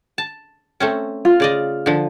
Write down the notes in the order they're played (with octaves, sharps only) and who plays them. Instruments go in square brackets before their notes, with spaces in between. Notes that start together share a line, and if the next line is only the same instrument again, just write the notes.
[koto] A5
A3 C4 C#4
[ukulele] F4
[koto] C#3 D5 D#5
D3 F3